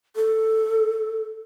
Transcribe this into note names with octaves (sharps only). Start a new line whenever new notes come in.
A4